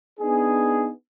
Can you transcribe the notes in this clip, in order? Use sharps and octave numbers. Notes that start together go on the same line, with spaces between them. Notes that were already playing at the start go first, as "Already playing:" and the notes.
B3 D4 D#4 G#4